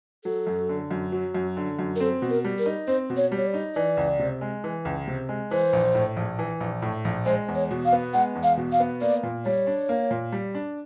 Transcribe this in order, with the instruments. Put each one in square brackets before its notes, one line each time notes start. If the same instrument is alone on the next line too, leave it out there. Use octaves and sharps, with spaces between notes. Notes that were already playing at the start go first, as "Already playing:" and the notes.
[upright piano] F#3 [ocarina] A4
[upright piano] F#2
D3
F#2
F#3
F#2
D3
F#2
[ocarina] A#4
[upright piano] C4 [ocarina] A4
[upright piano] B2
[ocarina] A#4
[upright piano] G3
[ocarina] A#4
[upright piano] D#4
[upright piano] C4 [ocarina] C5
[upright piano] B2
[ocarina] C#5
[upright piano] G3
[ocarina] C#5
D5
[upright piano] D#4
[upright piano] E3 [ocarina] D5
[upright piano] C#2
C3
G#3
E3
C#2
C3
G#3
[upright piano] E3 [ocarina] C5
[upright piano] A#1
A2
A#1
E3
A#1
A2
A#1
[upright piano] G#3 [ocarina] C5
[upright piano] E2
[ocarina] C#5
[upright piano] B2
[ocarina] F5
[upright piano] B3
[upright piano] G#3 [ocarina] F#5
[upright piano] E2
[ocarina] F5
[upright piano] B2
[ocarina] F5
[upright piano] B3
[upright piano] A#3 [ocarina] D5
[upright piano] A#2
[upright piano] G3 [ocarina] C#5
[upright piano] D4
A#3
A#2
G3
D4